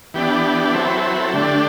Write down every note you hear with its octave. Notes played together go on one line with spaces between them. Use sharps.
E3 B3 D4 G4
F#3 C4 E4 A4
B4
A4
B4
A4
D3 A3 D4 G4